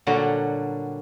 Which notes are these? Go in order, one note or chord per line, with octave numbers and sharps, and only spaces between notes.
A#2 D3 F#3 G3 F#4